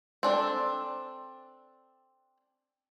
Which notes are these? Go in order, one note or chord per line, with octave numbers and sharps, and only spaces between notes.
C4 D4 A4